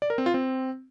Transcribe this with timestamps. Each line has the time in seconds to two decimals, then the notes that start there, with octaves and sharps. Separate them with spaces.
0.02 D5
0.10 A#4
0.18 C4
0.26 F4
0.34 C4